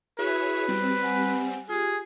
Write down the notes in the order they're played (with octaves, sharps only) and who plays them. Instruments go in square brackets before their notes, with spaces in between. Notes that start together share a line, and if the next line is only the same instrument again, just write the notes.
[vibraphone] E4 F#4 [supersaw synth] G#4 C#5 E5 [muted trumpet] B4
[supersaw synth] G3 C4
[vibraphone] F#5 G#5
[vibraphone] F4 G4 [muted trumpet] G#4